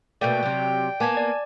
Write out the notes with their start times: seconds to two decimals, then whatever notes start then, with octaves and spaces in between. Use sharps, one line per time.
0.21 B2 A3 A#3 D5 G5 G6
0.43 C3 F#3
1.00 A#3 B3 G#5 A5 G#6
1.17 D5